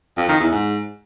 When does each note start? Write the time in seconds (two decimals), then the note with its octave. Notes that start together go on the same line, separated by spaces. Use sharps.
0.17 F2
0.29 D#3
0.40 E2
0.51 G#2